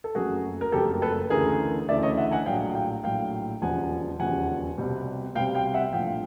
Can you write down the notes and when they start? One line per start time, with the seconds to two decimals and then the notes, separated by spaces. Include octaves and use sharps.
0.04 A4
0.15 F#1 F2 C#3 F#3 A3 F#4 G#4
0.61 A#4
0.72 F#1 F2 C#3 F#3 A3 G4 A4
1.02 A4 B4
1.30 D2 C#3 E3 A3 G#4 A#4
1.88 D2 C#3 E3 A3 D5 E5
2.03 C#5 D#5
2.17 E5 F#5
2.31 F#5 G#5
2.46 A#1 A2 F#3 F5 G5
2.75 F5 G5
3.04 A#1 A2 F#3 F5 G5
3.61 E1 D#2 C#3 F3 F#5 G#5
4.20 E1 D#2 C#3 F3 F#5 G#5
4.78 C2 B2 G3 C4
5.35 C2 B2 G3 C4 F5 G5
5.55 F5 G5
5.74 E5 F#5
5.93 A#1 A2 F3 F5 G5